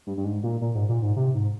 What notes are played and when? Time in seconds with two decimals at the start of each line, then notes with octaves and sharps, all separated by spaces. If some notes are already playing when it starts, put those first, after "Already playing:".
0.07 G2
0.17 G2
0.24 G#2
0.43 A#2
0.61 A#2
0.75 G#2
0.89 A#2
1.02 G#2
1.16 C3
1.34 G#2